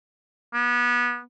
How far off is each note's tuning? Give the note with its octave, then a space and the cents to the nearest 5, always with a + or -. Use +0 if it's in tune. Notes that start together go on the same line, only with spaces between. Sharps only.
B3 -25